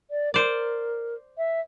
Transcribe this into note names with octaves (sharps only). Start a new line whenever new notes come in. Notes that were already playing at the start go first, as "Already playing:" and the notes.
D5
A#4 C5 D5
E5